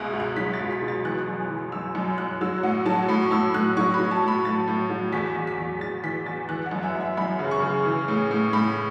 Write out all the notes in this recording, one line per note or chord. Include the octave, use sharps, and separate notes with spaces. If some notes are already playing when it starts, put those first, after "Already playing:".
Already playing: C#2 B2 E5 F#6
C#2
F#6
F#3 B6
A6
C#2
B6
B2
A6
E3 F#6
F#2
E3
F#2 E6
F#2
F#2 F#6
F#3 E6
A2 F#5
F#3 A5
A2 B5
C#6
A2 E6
A2 F#6
F#3 C#6
B5
F#3
A5
A2
B5
A2 A6
A2
F#3
E2 B6
E2
B6
E2
E2 A6
E3 B6
E2 A6
E3 F#6
F#5
F#2
E5
F#2
E5
F#2 B5
C#3
C#6
C#3
E3
A2
A2
A2 B5